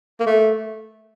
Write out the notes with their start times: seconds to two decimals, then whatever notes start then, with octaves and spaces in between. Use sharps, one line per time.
0.20 A#3
0.27 A3